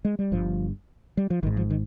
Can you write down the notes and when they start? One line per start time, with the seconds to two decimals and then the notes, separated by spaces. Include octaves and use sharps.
0.05 G#3
0.19 G3
0.32 G1 G2 F3
1.17 G3
1.30 F3
1.43 G#1 D#3
1.47 G#2
1.57 F3
1.70 D#3